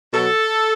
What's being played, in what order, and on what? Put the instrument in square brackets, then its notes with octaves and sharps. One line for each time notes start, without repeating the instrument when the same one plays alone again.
[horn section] B2 F#3 A4